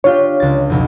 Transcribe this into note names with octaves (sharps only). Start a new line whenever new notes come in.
D4 F4 G4 C#5
C#2 A6
B1 F2